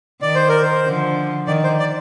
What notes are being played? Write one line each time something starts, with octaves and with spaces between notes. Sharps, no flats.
D#3 D5
C5
A#4
C5
D3 F3
D#3 D5
C5
D5